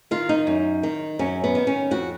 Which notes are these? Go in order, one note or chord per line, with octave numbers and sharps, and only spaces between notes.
D#3 F4
D#4
F#2
D#3
F#2 C#4
B3
D#3
C#4
F2 F#4